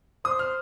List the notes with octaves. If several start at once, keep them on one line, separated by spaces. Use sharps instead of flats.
C5 D#6
F6